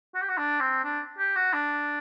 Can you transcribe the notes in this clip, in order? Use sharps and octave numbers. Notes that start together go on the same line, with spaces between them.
F#4
G4
F#4
D4
C4
D4
G4
F#4
D4